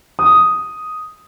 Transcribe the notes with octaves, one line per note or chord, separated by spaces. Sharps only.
D#6